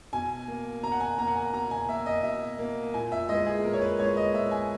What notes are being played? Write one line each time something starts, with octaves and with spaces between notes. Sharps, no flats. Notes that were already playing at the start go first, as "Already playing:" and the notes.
B2 G#5
A#3
B2 A#5
F#5
G#5
A#3 A#5
F#5
G#5
B2 A#5
G#5
A#3 E5
D#5
B2 E5
A#3
A#2 G#5
E5
G#3 B3 D#5
G#4
A#2 A#4
C#5
B4
G#3 B3 C#5
D#5
A#2 E5
G#5